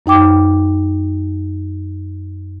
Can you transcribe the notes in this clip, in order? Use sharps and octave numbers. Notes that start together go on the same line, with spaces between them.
F#2 D#4 G5 D6